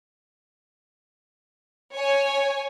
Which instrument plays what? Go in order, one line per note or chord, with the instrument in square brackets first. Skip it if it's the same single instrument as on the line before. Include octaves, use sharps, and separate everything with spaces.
[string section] C#5 G#5